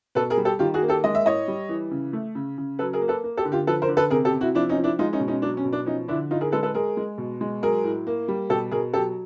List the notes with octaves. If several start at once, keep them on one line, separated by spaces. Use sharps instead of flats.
B2 A4 B4
G#4 A#4
G3
G4 A4
D#3 F4 G4
F#4 G#4
A#3
G4 A4
G#3 D#5
E5
A2 C#5 D#5
G3
E3
C#3
A3
C#3
C#3
F#3 A4 B4
G#4 A#4
A#3
A4 B4
A#3
G4 A4
D3
F4 G4
F3 A4 B4
A#4 C5
D3
A4 B4
C3 G#4 A#4
G4 A4
C3
E4 F#4
F3 D4 E4
C#4 D#4
F3
D4 E4
G#3 D#4 F4
C#4 D#4
B2
C#4 D#4
F#3 D4
C#4
B2
D4
F3 C#4 D#4
D3 D4 E4
A2 D#4 F4
G#4 A#4
G#3 A4 B4
A4 B4
G#3 G#4 A#4
G#3
B2
G#3
F#3 G#4 A#4
A2
A#3
G3
B2 G4 A4
B2 G#4 A#4
F#3 G4 A4